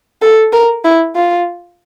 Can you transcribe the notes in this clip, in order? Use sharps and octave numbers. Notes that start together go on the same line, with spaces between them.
A4
A#4
E4
F4